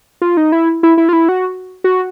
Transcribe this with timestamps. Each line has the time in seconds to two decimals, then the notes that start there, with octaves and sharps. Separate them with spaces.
0.22 F4
0.37 D#4
0.52 E4
0.83 E4
0.98 E4
1.09 F4
1.13 E4
1.29 F#4
1.84 F#4